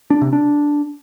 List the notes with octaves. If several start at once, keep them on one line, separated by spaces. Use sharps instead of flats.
D4
C3
D4